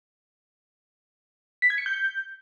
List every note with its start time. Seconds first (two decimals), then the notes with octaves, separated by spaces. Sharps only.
1.62 B6
1.70 G#6
1.78 C#7
1.86 G6